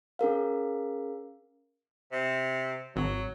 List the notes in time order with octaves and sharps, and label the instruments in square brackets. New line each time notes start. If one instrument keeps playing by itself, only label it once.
[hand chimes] C#4 G#4 A#4 F5
[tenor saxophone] C3
[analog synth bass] G#1 [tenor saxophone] F#3